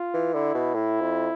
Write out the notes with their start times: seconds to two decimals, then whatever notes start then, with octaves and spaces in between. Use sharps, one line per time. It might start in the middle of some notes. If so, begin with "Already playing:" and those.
Already playing: F4
0.14 E3
0.34 D3 E4
0.55 B2
0.75 A2 E4
1.01 F2